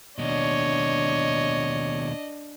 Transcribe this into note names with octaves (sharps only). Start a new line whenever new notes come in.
D#2 B2 D4 C#5 D#5